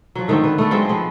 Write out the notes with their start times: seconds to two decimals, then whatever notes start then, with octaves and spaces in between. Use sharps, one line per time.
0.15 F3 F#3
0.28 D3 D#3 A3 C4
0.44 B4
0.58 A3 B3 A4
0.71 F#3 G#3 C4 F4
0.89 F3 B3